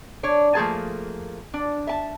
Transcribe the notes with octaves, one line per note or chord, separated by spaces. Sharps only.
D4 C#5
F3 A3 A#3 G#4 A5
D4
E5 A5